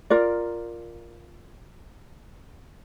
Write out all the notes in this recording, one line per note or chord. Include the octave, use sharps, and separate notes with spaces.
F4 A#4 D5